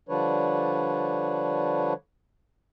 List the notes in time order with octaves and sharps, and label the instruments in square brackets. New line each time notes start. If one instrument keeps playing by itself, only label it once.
[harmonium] D3 F3 G3 D4 B4 C#5